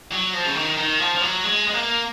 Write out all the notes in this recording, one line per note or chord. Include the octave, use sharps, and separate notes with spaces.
F#3
F3
C#3
D#3
D#3
F3
F3
F#3
G#3
G#3
A#3